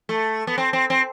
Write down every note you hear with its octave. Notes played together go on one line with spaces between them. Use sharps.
A3
B3
C4
C4
C4